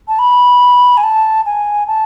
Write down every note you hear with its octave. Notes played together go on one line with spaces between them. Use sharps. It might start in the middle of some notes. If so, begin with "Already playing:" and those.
A5
B5
G#5
A5
G#5
A5